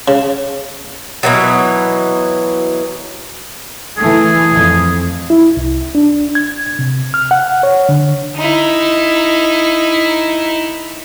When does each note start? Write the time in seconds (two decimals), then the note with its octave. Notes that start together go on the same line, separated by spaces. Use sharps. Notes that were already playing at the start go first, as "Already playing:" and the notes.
0.08 C#3
1.23 B2 E3 F#3
3.97 E3 A3 G#4
4.51 F2
5.30 E4
5.57 C2
5.95 D4
6.35 G#6
6.79 C3
7.14 F6
7.31 F#5
7.63 C#5
7.89 D3
8.36 D#4 E4